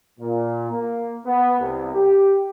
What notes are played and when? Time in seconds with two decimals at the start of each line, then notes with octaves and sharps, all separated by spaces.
0.20 A#2
0.72 A#3
1.26 B3
1.60 C2
1.94 G4